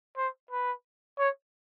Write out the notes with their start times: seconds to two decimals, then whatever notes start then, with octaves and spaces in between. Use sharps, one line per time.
0.17 C5
0.51 B4
1.19 C#5